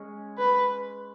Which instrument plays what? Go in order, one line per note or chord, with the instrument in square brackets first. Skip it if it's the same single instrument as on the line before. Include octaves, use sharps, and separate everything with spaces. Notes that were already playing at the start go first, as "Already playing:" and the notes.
Already playing: [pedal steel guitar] G#3 C#4 G#4
[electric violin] B4